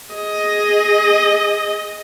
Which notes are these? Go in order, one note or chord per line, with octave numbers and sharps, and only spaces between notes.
G#4 D#5